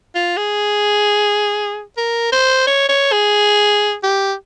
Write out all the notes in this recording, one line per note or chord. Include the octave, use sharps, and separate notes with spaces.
F4
G#4
A#4
C5
C#5
C#5
G#4
G4